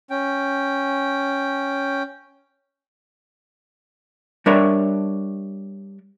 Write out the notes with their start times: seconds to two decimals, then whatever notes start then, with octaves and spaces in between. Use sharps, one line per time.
0.10 C#4 G5
4.46 G3 D4 A#4 C#5 D5 E5